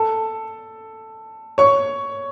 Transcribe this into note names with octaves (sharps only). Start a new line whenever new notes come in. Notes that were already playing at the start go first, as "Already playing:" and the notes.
Already playing: A4 A5
C#5 C#6